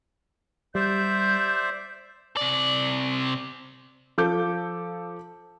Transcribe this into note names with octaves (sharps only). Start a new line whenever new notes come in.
G3 C5 D5 E5 G6
C3 D5
F3 A4 D6 G6